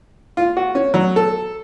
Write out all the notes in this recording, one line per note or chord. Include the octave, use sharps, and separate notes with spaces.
F4
F#4
C#4
F#3
A4